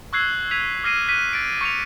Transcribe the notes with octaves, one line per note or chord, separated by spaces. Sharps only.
C#6 E6 F#6 G#6 C7 F#7
E6 F#6 G#6 B6 D#7 F7
D6 F6 A#6 C7 D#7
F#6 B6 D#7
A6 D7
C#6 G6 C#7 D#7 F7